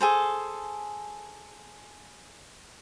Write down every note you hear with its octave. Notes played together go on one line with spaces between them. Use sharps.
G#4 A4 C5